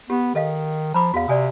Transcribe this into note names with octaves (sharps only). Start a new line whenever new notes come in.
B3 G4
D#3 A4 D#5 F5
F3 A#5 B5 D6
E2 F#4 F5
C3 D5 G#5 D#6